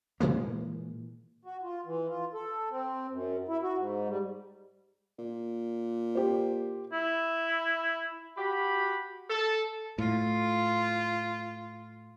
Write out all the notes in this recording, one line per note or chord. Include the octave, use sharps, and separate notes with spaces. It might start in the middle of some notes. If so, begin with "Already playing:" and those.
A#2 E3 G#3 A#3
F#4
F4
E3
F4
A4
C4
F#2
E4
F#4
G#2
G3
A#2
G4 C5
E4
F#4 G4 B5
A4
A2 F4